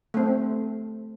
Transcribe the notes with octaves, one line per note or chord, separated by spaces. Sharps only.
A3 C4